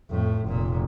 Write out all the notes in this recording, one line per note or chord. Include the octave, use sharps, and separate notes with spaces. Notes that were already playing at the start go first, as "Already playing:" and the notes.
F2 A2
F1 A#2